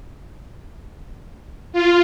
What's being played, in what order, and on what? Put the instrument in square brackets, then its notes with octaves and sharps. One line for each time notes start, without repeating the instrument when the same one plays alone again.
[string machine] F4